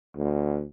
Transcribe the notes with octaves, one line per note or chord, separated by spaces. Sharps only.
D2